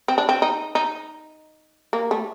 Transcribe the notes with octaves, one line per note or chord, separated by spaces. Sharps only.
C4
D4
C4
D#4
D#4
A#3
A3